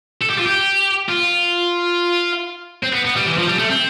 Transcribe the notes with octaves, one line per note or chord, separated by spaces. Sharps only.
A4
G4
F4
G4
F4
C4
B3
B3
G3
E3
F3
G3
A3
C4